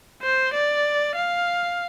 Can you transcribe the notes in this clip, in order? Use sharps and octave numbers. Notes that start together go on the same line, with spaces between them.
C5
D5
F5